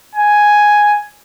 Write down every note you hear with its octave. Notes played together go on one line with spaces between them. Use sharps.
G#5